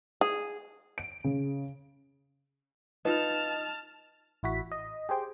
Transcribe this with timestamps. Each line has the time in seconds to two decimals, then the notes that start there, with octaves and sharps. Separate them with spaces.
0.21 G#4
0.98 D7
1.24 C#3
3.05 D#4 F4 B4 D#5 A5 F6
4.43 A1 E4 F#4 B6
4.72 D#5
5.09 G4 G#4 C5 G5